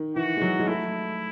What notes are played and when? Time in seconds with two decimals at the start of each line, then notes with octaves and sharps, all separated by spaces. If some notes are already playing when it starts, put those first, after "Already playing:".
Already playing: D#3
0.16 E3 F#4
0.37 G#3
0.42 F#3
0.59 G#3
0.68 A3 E4